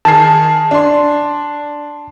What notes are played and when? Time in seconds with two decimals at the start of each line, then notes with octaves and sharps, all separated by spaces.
0.05 D#3 G#4 A5 C7
0.71 D4 C6